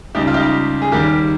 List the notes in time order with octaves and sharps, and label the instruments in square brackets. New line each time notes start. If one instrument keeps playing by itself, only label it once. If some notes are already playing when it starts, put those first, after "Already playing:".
[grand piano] C#2 C#3 G3 D#4 G4
F4
D#4 G4
G#4
D#2 D#3 G3 G4 A#4